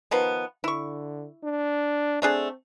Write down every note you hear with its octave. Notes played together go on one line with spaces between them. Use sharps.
D#3 F3 B3
D3 E4 C#6
D4
A3 C4 D4 G#4